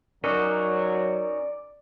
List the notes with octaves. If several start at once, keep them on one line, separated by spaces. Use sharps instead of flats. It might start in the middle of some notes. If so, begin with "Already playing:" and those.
F#2 F#3 C#4 D#4 F#4 A#4 D5